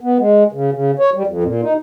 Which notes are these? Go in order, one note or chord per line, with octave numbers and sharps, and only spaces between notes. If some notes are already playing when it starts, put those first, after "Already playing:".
B3
G#3
C#3
C#3
C#5
G3
F2
A#2
D#4